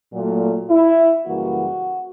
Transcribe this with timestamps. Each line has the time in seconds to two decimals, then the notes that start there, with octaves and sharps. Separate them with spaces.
0.13 A#2 F#3 A3
0.70 E4
1.26 F#2 C#3 E3 G3 A#3 F#4